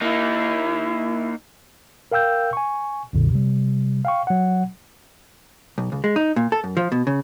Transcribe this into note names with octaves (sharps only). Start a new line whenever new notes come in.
A#3 D#4 E4
A#4 F5 G5 E6 G6
G#5 C#6
B1 F2 A#2 D3
C3 G3
F5 G5 C#6
F#3 F#5
B1
C#2
G#3
D#4
A#2
A4
F#2
F3
B2
C#3